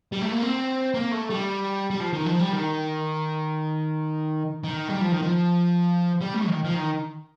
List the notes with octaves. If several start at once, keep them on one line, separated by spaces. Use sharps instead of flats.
G3
A3
A#3
C4
A#3
A3
G3
G3
F3
D#3
F3
G3
D#3
D#3
G3
F3
D#3
F3
G3
A3
D#3
F3
D#3